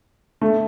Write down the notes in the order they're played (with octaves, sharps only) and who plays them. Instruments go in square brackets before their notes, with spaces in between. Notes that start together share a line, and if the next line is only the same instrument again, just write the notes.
[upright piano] A3